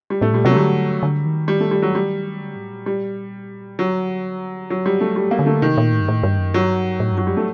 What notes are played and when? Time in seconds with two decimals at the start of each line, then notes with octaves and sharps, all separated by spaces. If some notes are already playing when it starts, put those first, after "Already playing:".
0.10 G3
0.21 A2 A3
0.33 A#2 G3
0.45 C3 F#3
0.51 A3
0.56 D3 G3
1.03 D3
1.25 D#3
1.48 G3
1.60 A3
1.71 G3
1.82 F#3
1.95 G3
2.41 D3
2.56 A2
2.71 A#2
2.86 G3
3.79 D3 F#3
4.70 F#3
4.86 G3
5.01 A3
5.16 D#3 G3
5.31 A#3
5.39 D3
5.46 A3
5.62 C3 D#3
5.77 A#2
5.93 A2
6.01 G2
6.08 A2
6.23 G2
6.39 F#2
6.54 G2 F#3
7.00 A2
7.12 G2
7.18 F#3
7.23 F#2 G3
7.37 A3